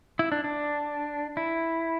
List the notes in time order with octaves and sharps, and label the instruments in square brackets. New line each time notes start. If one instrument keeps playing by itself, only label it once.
[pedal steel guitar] E4
D4
D4
E4